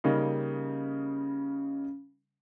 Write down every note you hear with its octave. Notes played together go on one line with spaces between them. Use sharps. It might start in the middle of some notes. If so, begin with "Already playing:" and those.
C#3 G3 A#3 D#4